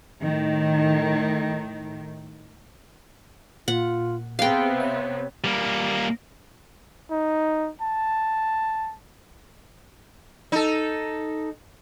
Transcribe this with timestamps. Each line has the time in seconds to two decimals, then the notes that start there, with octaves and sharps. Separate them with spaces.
0.21 A2 D#3
3.68 A#2 F4 F#5
4.39 C3 B3 C4 G#4 F5 G5
4.80 C#5 E5
5.44 G3 A#3
7.11 D#4
7.82 A5
10.52 D#4 A4